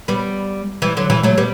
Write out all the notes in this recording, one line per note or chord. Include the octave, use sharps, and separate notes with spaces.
G3 B3
E3 G3
D3 F#3
E3 G3
F#3 A3
G3 B3